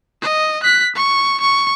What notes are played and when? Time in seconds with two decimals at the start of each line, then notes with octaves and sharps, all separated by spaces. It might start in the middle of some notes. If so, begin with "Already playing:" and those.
0.22 D#5
0.63 F#6 B6
0.95 C#6
1.41 C#6